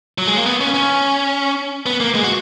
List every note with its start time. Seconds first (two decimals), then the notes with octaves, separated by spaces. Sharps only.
0.18 F#3
0.27 G#3
0.37 A#3
0.46 B3
0.61 C#4
0.74 C#4
1.86 B3
2.00 A#3
2.15 G#3
2.24 F#4